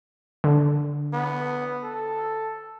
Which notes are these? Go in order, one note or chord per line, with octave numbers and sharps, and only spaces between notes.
D3
B3
A4